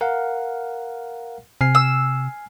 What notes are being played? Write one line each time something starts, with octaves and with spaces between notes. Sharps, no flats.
A#4 F5 F#5
C3 G#5 F6 C7
E6